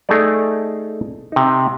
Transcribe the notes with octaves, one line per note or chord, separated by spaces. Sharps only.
A3 D#4 G#4 A4 D5
C3 D#4